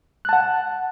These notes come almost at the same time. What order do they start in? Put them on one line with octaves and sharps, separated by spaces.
F#6 A5 F#5